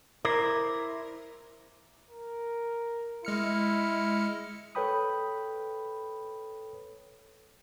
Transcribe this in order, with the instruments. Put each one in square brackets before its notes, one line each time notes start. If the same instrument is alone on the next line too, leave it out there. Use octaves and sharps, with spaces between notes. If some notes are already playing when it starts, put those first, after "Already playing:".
[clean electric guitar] E4 C5 D5 [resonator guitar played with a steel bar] A#4
[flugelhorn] A#4
[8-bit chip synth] G#3 F6 C#7 [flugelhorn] E4
[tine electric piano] A4 B4 C#5 G5 B5 D#6